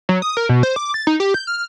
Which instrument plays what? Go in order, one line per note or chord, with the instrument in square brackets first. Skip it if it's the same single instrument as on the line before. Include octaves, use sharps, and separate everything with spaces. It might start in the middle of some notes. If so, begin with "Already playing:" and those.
[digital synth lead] F#3
D#6
A#4
B2
C5
D6
A6
D#4
G4
G6
F6